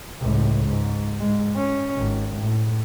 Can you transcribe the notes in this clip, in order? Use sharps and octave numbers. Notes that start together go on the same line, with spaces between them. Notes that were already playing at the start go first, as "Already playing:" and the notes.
C#2 A2
G#2
G#2 G#3
C#4
G#1
A2